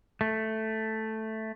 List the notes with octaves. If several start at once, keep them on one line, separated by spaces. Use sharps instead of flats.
A3